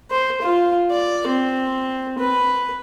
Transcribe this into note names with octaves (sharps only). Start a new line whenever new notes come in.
C5
F4
D5
C4
B4